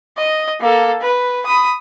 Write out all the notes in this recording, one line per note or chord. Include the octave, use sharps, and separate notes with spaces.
D#5
A#3 A4
B4
B5 D#6